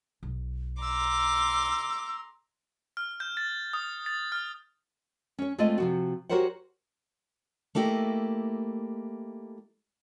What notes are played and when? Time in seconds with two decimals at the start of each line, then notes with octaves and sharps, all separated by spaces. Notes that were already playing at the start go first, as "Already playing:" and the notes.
0.23 B1
0.82 A#5 C6 D6 E6
2.97 F6
3.20 G6
3.37 A6
3.73 D#6
4.06 A6
4.32 F6
5.39 C#4 C#5
5.58 G#3 A3 C4 F4 D5 D#5
5.78 C3 F3 F#4
6.29 F#4 G4 A#4 C5 C#5 F#5
7.75 A3 A#3 E4 G4 D#5